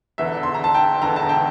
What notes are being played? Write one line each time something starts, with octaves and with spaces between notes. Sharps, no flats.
E1 E2 D3 E5
C6
A#5
A5
G5
E1 E2 D3 A#5
A5
G5